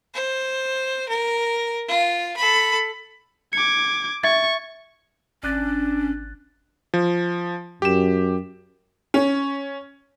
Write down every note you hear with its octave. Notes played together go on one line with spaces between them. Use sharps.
C5
A#4
F4
A4 B5
D6 G#6 C#7
E5 C#6 G#6 A6
G#1 C#4 D4 F#6 A6
F3
F#2 G4 E7
C#4